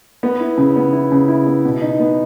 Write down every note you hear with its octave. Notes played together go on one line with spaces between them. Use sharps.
B3
E4
C#3
B3
E4
C#3
E4
B3
B2
D#4
B3